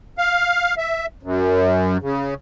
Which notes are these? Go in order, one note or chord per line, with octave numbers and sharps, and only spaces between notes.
F5
E5
F#2
C#3